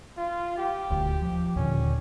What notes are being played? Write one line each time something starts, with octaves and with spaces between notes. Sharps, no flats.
F4
G4
D#1 D2
F3
D#2 A#2 D3 C#4